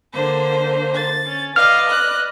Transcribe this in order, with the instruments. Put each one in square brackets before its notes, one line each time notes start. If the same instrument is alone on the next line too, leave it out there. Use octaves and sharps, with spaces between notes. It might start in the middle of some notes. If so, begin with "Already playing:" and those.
[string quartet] D3 A#3 C5
[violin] A6
[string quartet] C#4
[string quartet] B4 D5 D#5 [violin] F5 [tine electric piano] F6
[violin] F#6